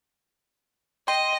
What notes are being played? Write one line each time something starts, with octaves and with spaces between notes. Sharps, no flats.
D#5 G5 C6